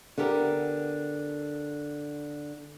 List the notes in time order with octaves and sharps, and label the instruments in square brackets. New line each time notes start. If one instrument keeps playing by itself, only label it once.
[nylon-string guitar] D3 B3 G4 A#4